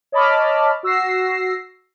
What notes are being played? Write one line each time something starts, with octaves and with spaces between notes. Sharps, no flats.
C#5 D#5 A5 B5 D6 F6
F#4 E6 A#6 C7